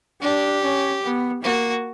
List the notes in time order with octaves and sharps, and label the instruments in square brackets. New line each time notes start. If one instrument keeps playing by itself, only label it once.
[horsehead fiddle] D4 [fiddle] G4
[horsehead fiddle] C#4
B3
[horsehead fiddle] A#3 [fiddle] F#4